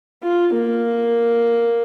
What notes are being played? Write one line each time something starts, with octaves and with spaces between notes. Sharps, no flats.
F4
A#3